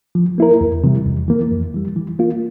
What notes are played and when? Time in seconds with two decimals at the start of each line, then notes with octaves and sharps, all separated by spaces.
0.15 F3
0.38 A#3 E4 A#4
0.61 E2
0.84 C3 E3 G3
1.06 E2
1.28 E3 A#3
1.52 F2
1.74 E3 G3
1.96 E3
2.19 A#3 F4